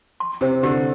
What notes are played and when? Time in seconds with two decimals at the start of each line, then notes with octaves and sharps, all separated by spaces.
0.20 C6
0.41 C3 C5
0.63 D3 G4